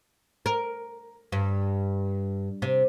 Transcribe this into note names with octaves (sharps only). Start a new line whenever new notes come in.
A#4
G2
C3